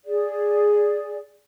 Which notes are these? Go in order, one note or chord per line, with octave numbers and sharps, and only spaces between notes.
G#4 D5